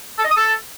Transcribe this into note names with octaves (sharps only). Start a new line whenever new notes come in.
A4
D#5
D#6
A4